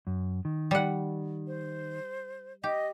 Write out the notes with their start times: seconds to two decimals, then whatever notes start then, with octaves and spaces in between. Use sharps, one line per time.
0.07 F#2
0.45 D#3
0.71 G3 F#5
1.47 C5
2.64 G4 D#5